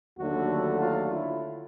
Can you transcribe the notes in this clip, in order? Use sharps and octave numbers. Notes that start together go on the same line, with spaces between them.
D#2 D3 F#3 A3 F#4
F4
E4